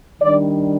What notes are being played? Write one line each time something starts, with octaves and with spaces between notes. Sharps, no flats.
D#3 G3 D4 D5